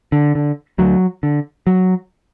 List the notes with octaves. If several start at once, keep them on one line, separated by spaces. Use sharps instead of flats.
D3
D3
D2 F#3
D3
F#3